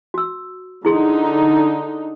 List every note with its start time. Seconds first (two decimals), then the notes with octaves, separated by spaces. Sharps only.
0.14 F#4 E6
0.85 D3 D#4 E4 G#4 C6